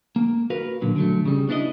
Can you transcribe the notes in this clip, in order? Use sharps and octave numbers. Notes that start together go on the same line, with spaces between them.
A#3
F#4 A#4 B4 F5
A#2 D3 F#3
D3 F#3 A3
C#3 G3
B3 D4 E4 C#5 D#5